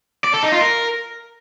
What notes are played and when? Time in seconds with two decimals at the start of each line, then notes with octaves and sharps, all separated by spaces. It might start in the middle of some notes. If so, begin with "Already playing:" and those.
0.24 D5
0.34 A4
0.43 D#4
0.52 F4
0.61 A#4